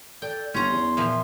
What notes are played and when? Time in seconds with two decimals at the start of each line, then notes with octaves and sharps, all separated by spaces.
0.22 A4 D5 G5
0.54 G1 C#4 E4 A#5 C6
0.72 E2
0.97 A#2 F3 E5